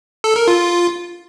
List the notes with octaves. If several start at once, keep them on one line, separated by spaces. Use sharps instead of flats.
A4
A#4
F4